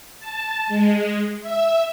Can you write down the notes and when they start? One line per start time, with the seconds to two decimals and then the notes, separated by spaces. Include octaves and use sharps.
0.20 A5
0.68 G#3
1.41 E5